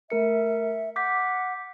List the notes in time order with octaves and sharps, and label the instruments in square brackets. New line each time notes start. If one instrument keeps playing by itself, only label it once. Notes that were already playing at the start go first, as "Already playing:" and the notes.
[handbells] A3 A#4 C#7 [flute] E5
[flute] F#5 [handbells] D6 G6 B6